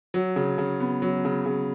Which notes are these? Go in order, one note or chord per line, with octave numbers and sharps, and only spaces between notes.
F#3
C#3
C#3
B3
F#3
C#3
C#3